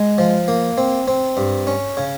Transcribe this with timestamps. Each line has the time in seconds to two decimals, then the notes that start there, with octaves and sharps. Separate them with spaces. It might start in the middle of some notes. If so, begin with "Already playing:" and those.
Already playing: G#3
0.18 F3
0.48 A#3
0.78 C4
1.08 C4
1.37 G2
1.67 C#4
1.97 C#3